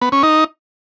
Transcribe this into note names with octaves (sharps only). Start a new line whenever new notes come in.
B3
C#4
D#4